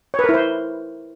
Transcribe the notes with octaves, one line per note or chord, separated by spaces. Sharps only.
C#5
B4
A#4
E4
C5